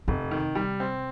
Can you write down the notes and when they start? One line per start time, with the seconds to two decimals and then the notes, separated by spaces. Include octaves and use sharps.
0.08 F1 C3
0.31 D#3
0.55 G3
0.80 C4